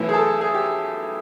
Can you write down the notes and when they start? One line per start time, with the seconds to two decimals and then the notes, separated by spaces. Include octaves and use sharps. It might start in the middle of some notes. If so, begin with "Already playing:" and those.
Already playing: B1 A2 E3
0.09 G#4
0.14 A4
0.41 G#4
0.54 G4